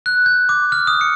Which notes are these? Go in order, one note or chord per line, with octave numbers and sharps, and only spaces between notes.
F#6
G6
D6
F6
D#6
C#7